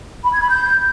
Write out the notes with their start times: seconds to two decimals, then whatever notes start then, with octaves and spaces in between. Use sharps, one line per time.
0.24 B5
0.33 G#6
0.41 B5
0.50 G6